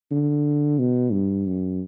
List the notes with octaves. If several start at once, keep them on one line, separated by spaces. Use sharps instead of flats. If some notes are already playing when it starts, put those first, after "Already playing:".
D3
B2
G2
F#2